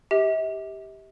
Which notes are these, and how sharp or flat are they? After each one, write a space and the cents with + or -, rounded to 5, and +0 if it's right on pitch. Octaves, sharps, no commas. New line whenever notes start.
G4 +0 E5 -45